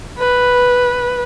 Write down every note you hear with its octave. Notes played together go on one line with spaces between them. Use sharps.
B4